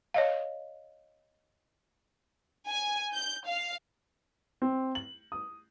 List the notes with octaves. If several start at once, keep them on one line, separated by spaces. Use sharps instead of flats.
C#5 D#5 F5
G#5
G6
F5
C4
F#7
D#6